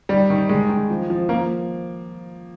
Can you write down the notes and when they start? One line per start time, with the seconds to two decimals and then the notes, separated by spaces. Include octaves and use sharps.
0.09 D#3 G3
0.30 D#3
0.49 D#3 G#3
0.69 D#3
0.90 F3
1.10 F3
1.29 F3 A#3